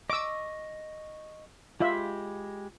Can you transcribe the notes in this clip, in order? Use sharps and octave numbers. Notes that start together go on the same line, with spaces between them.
D#5 C#6 D6 E6
G#3 F4 G4 E5 B5